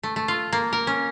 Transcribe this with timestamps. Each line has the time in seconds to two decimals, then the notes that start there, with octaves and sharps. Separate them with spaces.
0.03 A3
0.16 A3
0.28 F4
0.53 A#3
0.73 A#4
0.87 C#4